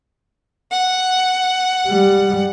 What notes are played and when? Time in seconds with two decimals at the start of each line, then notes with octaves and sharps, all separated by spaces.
0.71 F#5
1.88 G3